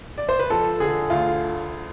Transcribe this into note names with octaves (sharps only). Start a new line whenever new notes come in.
D5
C5
B4
F3 A4
D3 G#4
D2 F4